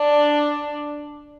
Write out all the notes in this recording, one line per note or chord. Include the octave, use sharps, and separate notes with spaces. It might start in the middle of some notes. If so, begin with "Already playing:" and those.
Already playing: D4